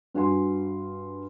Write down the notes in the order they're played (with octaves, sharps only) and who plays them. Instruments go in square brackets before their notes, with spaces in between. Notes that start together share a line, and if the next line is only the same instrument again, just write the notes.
[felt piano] G2 F#4 G#5 C6